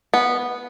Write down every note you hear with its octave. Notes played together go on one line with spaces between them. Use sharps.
B3